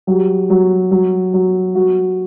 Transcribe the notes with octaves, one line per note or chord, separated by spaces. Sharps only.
F#3 G4
F#3
F#3
F#3
F#3 F#4